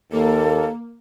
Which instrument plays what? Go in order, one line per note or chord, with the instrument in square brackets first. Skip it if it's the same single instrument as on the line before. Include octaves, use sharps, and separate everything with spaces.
[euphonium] D#2 [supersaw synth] A#3 [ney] A4